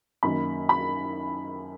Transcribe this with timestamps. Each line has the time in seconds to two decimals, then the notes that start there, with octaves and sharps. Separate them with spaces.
0.23 F#2 D#3 A#3 B5
0.69 B5